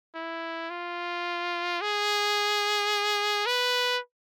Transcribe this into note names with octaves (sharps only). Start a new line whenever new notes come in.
E4
F4
G#4
B4